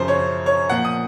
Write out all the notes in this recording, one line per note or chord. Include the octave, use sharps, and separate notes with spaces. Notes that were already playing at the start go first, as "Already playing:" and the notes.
Already playing: F#2 C#3 F3 C5
C#5
C#5
A#2 F3 F#5
D#6